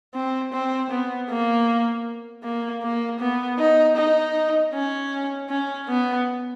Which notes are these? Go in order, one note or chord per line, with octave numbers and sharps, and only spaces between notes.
C4
C4
B3
A#3
A#3
A#3
B3
D#4
D#4
C#4
C#4
B3